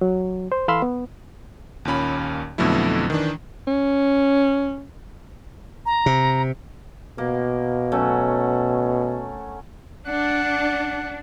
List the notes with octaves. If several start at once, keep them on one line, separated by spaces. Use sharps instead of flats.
F#3
C5
E3 A4 F5 B5 C6 E6
B3
D#2 A#2 C#4 B5
F2 B2 D3 F#3 A3 E4
D#3 E3 D4
C#4
A#5
C3
B2 A#3
F#3 A3 C#4
D4 F#5